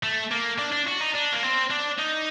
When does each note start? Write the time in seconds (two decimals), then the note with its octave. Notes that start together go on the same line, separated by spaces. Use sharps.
0.03 A3
0.32 A#3
0.59 D4
0.72 D4
0.87 F#4
1.00 D#4
1.14 D4
1.32 A#3
1.43 C4
1.70 D4
1.98 D#4